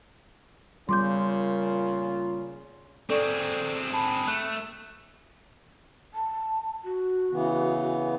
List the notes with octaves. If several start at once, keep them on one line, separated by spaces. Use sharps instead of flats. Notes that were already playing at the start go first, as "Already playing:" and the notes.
A#2 C#3 G3 B3 F4 C6 D6 G6
C4 G#4 A4 D5 C#6
A5 B5
A3 F#6
A5
F#4
C#3 E3 B3